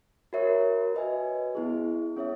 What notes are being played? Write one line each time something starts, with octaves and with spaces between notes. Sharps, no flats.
F#4 A#4 C#5 E5
F#4 B4 D#5 G#5
B3 E4 G#4
C#4 G#4 C#5 E5